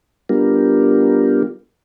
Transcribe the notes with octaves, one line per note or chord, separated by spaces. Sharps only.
G3 B3 D4 F4 G4 A#4